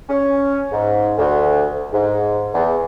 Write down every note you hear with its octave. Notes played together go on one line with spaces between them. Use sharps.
C#4
G#2
D2
G#2
E2